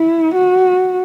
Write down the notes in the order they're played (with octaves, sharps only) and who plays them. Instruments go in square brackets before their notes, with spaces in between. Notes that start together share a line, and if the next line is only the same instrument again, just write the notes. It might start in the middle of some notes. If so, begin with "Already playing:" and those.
Already playing: [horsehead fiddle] E4
F#4